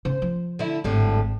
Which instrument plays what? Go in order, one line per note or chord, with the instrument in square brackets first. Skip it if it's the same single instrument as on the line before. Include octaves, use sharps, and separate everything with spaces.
[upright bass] C#3 [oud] C5
[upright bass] F3
[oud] D3 E4
[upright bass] G#1 [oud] A2 D3 G3